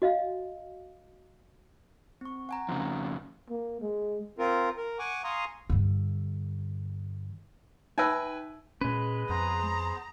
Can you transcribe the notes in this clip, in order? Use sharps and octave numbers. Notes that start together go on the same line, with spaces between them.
F#4 D#5 F5
C4 C#6
F#5 G#5 A#5
F2 C#3
A#3
G#3
C4 F4 A#4
A#4
F#5 G#5 C#6 D6
F5 G#5 A#5 C6 C#6 D#6
G2 D3
D#4 B4 E5 G5 G#5 E6
A#2 G#3 C#4 B4
F2 B3 G#4 C5 A#5